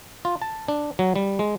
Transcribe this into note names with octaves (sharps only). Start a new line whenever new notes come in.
F4
A5
D4
F#3
G3
G#3